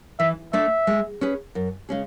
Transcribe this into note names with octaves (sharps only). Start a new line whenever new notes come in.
E3 E5
A3 D4 A4 E5
G#3
C#4 G#4 B4
F#2
C#3 G#3 C#4 G#4